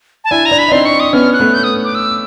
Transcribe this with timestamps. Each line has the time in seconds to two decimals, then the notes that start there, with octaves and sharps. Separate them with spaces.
0.24 A5
0.31 D4 E4 G#5
0.45 A#5
0.51 D4 E4
0.58 B5
0.68 D#4
0.72 C4 D4 C6
0.85 C#6
1.00 D#6
1.13 B3 C#4 F6
1.33 F#6
1.40 A3 B3
1.54 G6
1.64 D#6
1.84 D6
1.95 E6